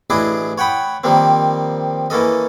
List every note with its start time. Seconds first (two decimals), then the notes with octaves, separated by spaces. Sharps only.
0.10 A1 D4 E4 G#4 D#5 D6
0.58 C#5 F#5 G5 B5 D#6
1.04 D#3 F3 G3 A#3 C4
2.10 E3 A#3 C#4 A4 D#5